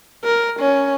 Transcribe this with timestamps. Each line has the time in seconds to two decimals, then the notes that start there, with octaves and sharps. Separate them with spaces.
0.24 A#4
0.60 C#4